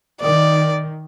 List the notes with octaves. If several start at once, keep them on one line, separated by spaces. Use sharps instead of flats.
D#3 D5